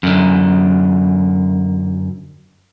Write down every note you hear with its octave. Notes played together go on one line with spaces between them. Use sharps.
F#2 D3